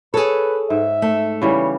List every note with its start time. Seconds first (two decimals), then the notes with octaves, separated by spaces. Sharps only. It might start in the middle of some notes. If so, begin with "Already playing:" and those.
0.14 G#4 A4 B4 C#5
0.70 G#2 E5
1.02 A3
1.42 C#3 E3 G3 C#5